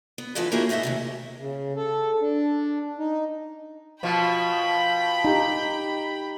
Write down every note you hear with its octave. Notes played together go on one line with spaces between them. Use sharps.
B3
D3 E3 F3 G#3 A4 B4
A#3 C#4 D#4 E4 F#4 G#4
G#2 A3 D#5 E5 F#5
D#2 G#2 C3
C#3
A4
D4
D#4
B2 F3 G5 B5
D#4 G4